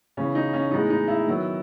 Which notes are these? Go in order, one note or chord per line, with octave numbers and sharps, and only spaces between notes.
C#3 E3 B3 C#4
D#4
C#4
A2 E3 G#3 B3 D#4
D#4
E4
D#3 F#3 B3